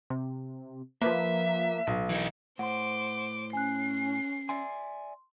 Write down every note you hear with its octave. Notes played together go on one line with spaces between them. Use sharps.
C3
F3 A#3 B4 E5
B1
E3 D#4
A2 C5 F#5 C6 D6
C#4 G#5 F#6 C7
D5 E5 G#5 C6